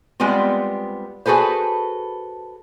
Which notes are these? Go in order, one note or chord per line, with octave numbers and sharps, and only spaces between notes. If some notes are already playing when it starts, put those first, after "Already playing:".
G3 G#3 B3 C4 F4
F#4 G#4 A4 B4 C5